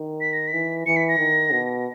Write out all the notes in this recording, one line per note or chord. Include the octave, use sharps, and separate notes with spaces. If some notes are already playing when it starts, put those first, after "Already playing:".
Already playing: D#3
B6
A#6
B6
E3
E3 C#7
B6
A#6
D#3
B2